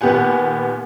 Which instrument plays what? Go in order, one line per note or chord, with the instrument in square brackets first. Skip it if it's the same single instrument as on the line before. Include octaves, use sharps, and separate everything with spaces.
[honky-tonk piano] D#2 A#2 B3 G4 F#5 G#5